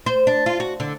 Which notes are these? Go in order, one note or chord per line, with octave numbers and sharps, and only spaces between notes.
C5
D4
F4
F#4
D3